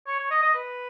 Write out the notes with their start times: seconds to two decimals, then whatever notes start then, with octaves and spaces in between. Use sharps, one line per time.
0.07 C#5
0.19 C#5
0.30 D#5
0.42 D#5
0.54 B4